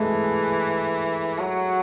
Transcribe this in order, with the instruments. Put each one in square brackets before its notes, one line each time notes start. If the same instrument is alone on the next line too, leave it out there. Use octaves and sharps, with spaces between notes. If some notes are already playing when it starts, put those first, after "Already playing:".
Already playing: [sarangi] E3 [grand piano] G#3 A3
[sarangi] F#3